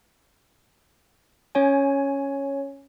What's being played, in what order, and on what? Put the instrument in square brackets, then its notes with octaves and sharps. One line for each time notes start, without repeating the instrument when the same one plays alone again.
[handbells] C#4 C#5 G#5